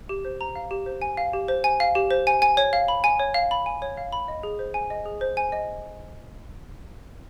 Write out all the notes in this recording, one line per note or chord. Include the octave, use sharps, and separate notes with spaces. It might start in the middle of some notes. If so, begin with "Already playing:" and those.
G4
C5
A#5
F5
G4
C5
G#5
F5
G4
C5
G#5
F5
G4
C5
G#5
G#5
C#5
F5
B5
G#5
C#5
F5
B5
G#5
C#5
F5
B5
D#5
G#4
C5
G#5
D#5
G#4
C5
G#5
D#5